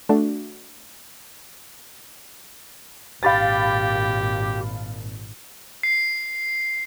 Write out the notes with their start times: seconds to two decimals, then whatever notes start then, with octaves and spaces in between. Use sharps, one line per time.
0.09 A3 D4 F#4
3.23 G#1 A#2 G4 F5 B5 A6
5.83 C7